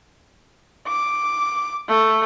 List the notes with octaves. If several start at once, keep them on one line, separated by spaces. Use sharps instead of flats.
D6
A3